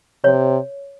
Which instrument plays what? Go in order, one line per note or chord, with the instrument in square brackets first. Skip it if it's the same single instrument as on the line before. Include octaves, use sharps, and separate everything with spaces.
[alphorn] C3 [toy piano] C#5